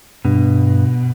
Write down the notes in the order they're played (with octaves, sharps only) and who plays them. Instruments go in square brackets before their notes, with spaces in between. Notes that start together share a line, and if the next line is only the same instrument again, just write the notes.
[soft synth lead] G2 [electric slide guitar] B2